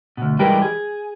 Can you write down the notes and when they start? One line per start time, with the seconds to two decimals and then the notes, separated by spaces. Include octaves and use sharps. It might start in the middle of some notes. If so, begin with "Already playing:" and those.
0.17 D2 B2
0.39 E3 G3 G#3 G4 A#4 B4
0.62 G#4